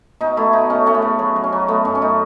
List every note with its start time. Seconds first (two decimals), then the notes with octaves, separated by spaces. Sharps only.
0.21 B2 D#4
0.37 A3 E4
0.53 B2 D#4
0.70 A3 C#4
0.86 A3 C#4
0.95 B3
1.02 C#3
1.19 F#3 B3
1.36 F#3
1.44 C#4
1.52 F#3
1.68 A3 B3
1.85 F#2 C#4
1.95 C#4
2.02 A3 D#4